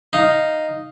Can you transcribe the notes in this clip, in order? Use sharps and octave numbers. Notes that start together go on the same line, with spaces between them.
D#4 F5